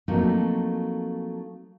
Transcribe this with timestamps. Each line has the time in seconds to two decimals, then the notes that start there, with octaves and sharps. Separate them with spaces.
0.08 F3 F#3 A3 A#3 C4 D#4